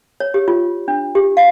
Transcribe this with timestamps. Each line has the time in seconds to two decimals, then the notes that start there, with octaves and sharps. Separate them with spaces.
0.20 C#5
0.34 G4
0.48 F4
0.88 D4
1.15 G4
1.37 F5